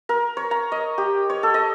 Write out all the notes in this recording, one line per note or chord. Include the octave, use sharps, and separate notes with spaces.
A#4
C#5
A#5
D#5
G4
C#5
A4
D#5